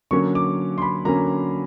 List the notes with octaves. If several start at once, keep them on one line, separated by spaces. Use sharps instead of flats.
D3 F#3 A#3 C#4 C#6
D6
C6
B5
D3 F#3 A#3 C#4 A#5